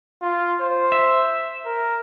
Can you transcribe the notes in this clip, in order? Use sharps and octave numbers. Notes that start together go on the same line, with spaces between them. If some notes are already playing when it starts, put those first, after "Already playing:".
F4
C5
E5
A#4